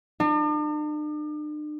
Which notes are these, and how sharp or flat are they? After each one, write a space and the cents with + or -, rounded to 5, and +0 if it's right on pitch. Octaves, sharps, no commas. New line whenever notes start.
D4 +45